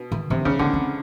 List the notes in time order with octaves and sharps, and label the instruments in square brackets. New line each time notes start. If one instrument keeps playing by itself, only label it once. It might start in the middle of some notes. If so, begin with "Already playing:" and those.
Already playing: [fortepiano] B2
[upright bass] D#3
[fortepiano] C3 [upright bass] D#3
[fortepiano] C#3 [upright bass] F3
[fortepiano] D3 [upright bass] B3
[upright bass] C4